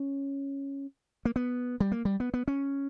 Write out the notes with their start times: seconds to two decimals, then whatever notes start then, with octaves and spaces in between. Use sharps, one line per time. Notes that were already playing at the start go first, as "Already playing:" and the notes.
Already playing: C#4
1.25 A#3
1.36 B3
1.80 G3
1.92 A#3
2.05 G3
2.20 B3
2.34 B3
2.48 C#4